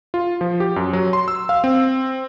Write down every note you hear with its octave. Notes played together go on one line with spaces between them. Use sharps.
F4
F3
G4
F#2
F#3
C6
E6
F5
C4